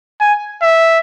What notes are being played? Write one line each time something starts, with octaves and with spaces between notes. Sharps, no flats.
G#5
E5